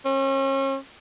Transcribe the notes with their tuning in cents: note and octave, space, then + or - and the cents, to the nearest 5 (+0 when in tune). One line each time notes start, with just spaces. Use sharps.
C#4 -35